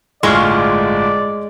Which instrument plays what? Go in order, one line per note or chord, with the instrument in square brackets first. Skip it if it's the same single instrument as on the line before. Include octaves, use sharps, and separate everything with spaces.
[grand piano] G1 A2 F4 [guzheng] G#3 [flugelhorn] D5 [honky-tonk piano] C6 C#6 F6